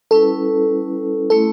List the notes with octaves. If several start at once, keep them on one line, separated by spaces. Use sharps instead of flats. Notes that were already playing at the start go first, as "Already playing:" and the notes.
G3 C#4 E4 A4 B4
A3 C#4 E4 A4